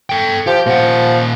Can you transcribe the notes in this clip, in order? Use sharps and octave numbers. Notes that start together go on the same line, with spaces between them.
A4 G5
F3 G4
A#2 F3 F#5